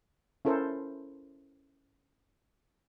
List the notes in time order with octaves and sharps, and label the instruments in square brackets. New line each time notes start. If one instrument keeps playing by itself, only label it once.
[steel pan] C#4 E4 A4 A#4 C5